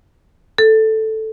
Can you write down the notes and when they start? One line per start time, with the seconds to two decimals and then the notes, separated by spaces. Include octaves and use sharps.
0.58 A4